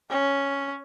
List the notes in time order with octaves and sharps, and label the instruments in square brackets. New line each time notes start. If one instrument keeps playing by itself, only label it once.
[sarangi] C#4